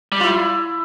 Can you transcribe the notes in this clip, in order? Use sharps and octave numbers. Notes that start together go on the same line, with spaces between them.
G3
E4 F4